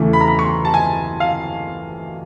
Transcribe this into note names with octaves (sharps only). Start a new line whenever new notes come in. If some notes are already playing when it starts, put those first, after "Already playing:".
Already playing: E2 C#3 E3 A3
B5
A#5
B5
C#6
C6
A5
G#5
F5